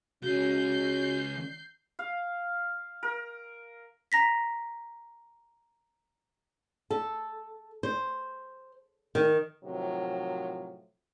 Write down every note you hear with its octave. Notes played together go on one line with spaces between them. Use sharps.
C#2 C#3 G#3 C#4 F#4 G6 C7
F5
A#4
A#5 A#6 B6
A4
C5
D#3
A2 C3 D#3 F3 F#3